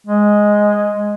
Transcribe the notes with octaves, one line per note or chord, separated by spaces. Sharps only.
G#3